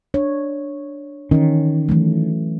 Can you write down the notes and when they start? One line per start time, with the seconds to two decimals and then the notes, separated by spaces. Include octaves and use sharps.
0.14 D4 C#5
1.31 D#3 E3 C#4
1.89 E3 F#3 A3